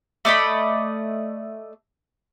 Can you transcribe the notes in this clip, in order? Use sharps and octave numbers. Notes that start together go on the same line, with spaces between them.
A3 D5 D#5 B5